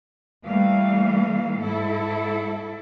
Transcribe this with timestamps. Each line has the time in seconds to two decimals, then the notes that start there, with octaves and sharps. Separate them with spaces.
0.45 E3 G3 A3 A#3 F5
1.60 G#2 E4 A4